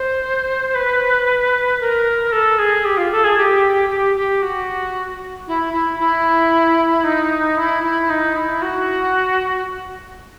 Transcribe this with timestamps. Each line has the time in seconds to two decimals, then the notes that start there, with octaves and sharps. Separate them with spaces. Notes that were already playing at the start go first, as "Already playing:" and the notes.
Already playing: C5
0.75 B4
1.81 A#4
2.32 A4
2.59 G#4
2.85 G4
2.97 F4
3.12 A4
3.24 G#4
3.37 G4
3.89 G4
4.16 G4
4.42 F#4
5.48 E4
5.73 E4
5.99 E4
7.04 D#4
7.57 E4
7.83 E4
8.10 D#4
8.35 E4
8.62 F#4